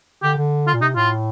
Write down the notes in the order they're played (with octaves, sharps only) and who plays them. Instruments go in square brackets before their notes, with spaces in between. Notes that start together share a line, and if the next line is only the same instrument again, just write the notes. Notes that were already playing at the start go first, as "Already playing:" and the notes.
[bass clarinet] D3 [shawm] G4
[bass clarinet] D3
[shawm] F4
[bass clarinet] A#2
[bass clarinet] C3 [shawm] D#4
[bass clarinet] A2 [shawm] F4